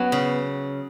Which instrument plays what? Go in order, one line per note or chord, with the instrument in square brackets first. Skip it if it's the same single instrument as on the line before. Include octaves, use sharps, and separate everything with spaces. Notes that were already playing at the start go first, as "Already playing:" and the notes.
Already playing: [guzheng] F#3 C#4 [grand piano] B3
[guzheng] C#3